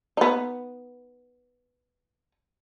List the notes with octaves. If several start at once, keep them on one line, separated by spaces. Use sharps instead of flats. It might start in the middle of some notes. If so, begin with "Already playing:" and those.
B3 D#4